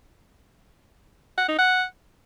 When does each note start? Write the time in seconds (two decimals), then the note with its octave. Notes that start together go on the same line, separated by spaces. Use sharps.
1.38 F#5
1.48 D#4
1.59 F#5